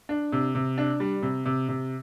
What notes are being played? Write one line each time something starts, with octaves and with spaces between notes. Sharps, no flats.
D4
C3
C3
D4
G3
C3
C3
C3